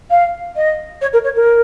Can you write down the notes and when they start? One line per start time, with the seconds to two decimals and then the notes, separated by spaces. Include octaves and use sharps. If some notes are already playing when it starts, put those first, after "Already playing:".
0.10 F5
0.56 D#5
1.01 C#5
1.13 A#4
1.24 C#5
1.36 A#4